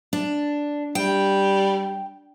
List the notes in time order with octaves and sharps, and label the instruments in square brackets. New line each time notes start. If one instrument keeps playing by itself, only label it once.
[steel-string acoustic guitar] D4
[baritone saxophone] G3 [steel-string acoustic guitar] G5